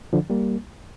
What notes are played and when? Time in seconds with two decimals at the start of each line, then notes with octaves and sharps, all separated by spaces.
0.13 D3 F3
0.30 G3 A#3